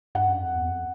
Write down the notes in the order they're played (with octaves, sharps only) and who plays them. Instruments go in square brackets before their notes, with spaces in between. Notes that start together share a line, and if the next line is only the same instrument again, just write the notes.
[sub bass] G2 [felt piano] F#5
[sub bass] F#2
F2
E2
F2